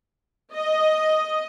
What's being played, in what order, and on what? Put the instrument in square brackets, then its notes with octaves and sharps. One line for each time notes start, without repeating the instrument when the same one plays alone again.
[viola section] D#5